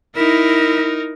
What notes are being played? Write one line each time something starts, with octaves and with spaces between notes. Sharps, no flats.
D#4 E4 A#4